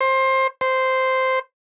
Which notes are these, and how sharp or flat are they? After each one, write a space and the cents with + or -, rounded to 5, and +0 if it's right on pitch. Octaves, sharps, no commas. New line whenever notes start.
C5 +20
C5 -5